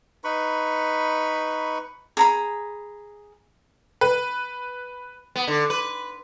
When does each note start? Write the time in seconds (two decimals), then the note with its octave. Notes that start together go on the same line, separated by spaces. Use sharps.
0.24 D#4 B4 B5 C#6
2.17 G#4 A#5 B5
4.01 B4
5.36 B3
5.47 D3
5.70 B4